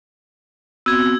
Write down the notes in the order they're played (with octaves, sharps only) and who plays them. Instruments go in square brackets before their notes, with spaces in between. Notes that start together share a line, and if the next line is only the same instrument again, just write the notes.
[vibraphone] B3 C4 F#4 [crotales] E6 G#6